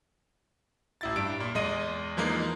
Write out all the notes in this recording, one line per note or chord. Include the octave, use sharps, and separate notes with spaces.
A1 E4 A6
G2 D7
A#2
E2 G#3 D#5 D#7
E3 F3 G#3 A#3 D#4